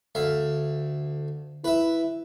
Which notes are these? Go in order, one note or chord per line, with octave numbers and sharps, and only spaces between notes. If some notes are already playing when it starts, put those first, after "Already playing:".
D2 E5 F5
E4 B4 E5